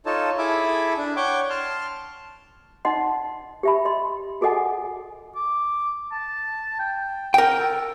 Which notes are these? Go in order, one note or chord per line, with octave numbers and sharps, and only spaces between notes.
D#4 F4 A4 C#5 A5
E4 G#4 A4 E5 B5 D6
D4
C#5 F#5 G5 C#6 D6
A5 C6 F6
D#4 D#5 F#5 C6
G4 E5 B5
D#5 C6
F#4 G#4 A4 D#5 F#5 G#5
D6
A5
G5
A#4 G5
A4